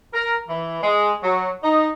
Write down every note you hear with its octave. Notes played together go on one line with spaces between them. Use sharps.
A#4
E3
G#3
F#3
D#4